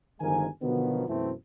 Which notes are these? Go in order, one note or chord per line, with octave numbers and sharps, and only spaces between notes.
G1 D#3 F3 G#3 A#4 G#5
B2 D3 D#3 F3 F#3 B3
F#2 B2 E3 A3 C4 E4